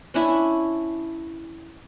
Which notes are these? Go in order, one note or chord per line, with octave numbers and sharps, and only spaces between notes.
C#4 D4 E4